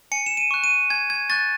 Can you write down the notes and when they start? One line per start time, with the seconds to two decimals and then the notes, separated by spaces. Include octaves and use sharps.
0.12 G#5 C#7
0.26 E7
0.37 D#7
0.51 C#6 F#6
0.64 D#7
0.90 G#5 G#6
1.10 G#6
1.30 C#6 F#6 A6